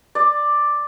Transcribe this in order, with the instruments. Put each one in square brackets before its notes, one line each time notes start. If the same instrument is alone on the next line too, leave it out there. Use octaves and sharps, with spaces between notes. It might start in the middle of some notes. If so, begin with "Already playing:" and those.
[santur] D5